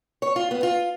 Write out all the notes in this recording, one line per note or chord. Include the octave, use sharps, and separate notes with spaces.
C#5
F4
B3
F4